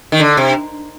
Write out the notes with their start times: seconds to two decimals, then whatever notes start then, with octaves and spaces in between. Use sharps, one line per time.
0.12 D#3
0.20 D3
0.37 C3